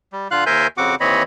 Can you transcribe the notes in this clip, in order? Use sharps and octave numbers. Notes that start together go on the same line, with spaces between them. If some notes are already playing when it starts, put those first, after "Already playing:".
G3
D3 F4 F5 F#6
D#2 A#4 C5 E5 G#5 G6
F2 C#3 C4 F#4 F#5 D6
D#2 E3 C4 C#5 D#5 B5